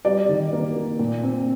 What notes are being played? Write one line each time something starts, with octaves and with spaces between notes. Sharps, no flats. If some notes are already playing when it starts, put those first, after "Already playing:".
G3 D5
D#3
A#3
A#3
A#2
C4